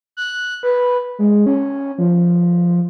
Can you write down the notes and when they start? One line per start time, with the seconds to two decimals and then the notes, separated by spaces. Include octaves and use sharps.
0.17 F#6
0.63 B4
1.19 G#3
1.46 C#4
1.98 F3